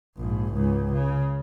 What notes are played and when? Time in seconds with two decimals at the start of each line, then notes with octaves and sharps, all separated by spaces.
0.17 A#1 G#2
0.53 C#2 G#2
0.92 C#3